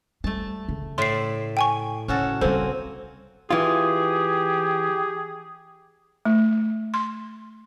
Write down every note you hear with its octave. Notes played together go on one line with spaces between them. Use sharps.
G3 A3 A5
C#3
A2 D5 E5 C6 C7
G5 G#5 C#6
C#3 C#4 F#4 A4
C#3 G3 A#3 C4 A4 C5 G#5
E3 F4 G4 G#4
A3
C6